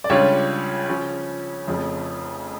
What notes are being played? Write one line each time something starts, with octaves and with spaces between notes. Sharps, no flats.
D5
C#2 C#3 G3 D4 F4 C#5
C#3 F3 C#4
F1 F2 C#3 F3